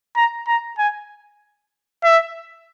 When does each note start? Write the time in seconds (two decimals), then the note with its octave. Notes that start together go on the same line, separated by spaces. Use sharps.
0.16 A#5
0.47 A#5
0.79 G#5
2.04 E5